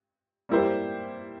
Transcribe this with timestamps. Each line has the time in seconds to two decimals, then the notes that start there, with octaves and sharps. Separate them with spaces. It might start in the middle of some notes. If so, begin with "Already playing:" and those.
0.49 G3 A#3 E4 G4 C5